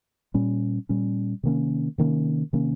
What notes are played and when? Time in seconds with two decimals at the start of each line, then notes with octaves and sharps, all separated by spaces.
0.34 A#2 G3 C#4
0.89 A#2 G3 C#4
1.43 C3 D#3 A#3 C#4
1.98 C3 D#3 A#3 C#4
2.53 C3 D#3 A#3 C#4